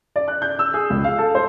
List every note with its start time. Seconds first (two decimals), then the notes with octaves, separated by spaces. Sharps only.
0.16 D5
0.28 F#6
0.42 G6
0.59 E6
0.74 G#4
0.90 C#2
1.04 F5
1.18 A4
1.35 C5